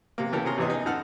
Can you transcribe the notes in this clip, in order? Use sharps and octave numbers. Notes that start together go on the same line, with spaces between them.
C3 A#3
C#3 E3 B3 G4 A4 A#4
C3 C#4 G#4 A#5 C6 F6
A1 C3 E3 B3 G#4 D#5
D#4 G#4
F#2 D#4 A4 F#5 F6